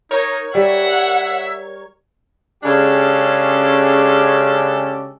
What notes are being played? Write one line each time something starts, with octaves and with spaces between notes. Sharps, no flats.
D#4 A#4 C#5 G#6
G3 E5 F#5
C#3 G#3 C#4 D4 G4 A4